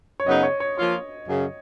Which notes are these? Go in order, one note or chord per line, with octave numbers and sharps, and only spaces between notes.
C#5
F#2 C#3 F#3 B3 D#4 D#5
C#5
C#5
F3 A#3 F4 C#5
F#2 C#3